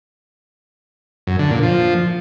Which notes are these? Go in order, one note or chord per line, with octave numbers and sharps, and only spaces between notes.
F#2
D3
A#2
F3